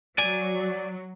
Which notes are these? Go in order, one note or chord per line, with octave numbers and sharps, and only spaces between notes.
F#3 D5 G#5